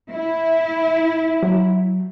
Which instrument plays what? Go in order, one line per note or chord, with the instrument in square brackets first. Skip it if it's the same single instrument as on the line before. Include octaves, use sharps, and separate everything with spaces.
[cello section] E4
[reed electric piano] F#3